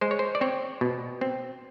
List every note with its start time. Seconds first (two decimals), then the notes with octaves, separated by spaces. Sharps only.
0.01 G#3 C5
0.11 C#5
0.19 C5
0.35 D5
0.41 C4 C#5
0.81 B2
1.21 C4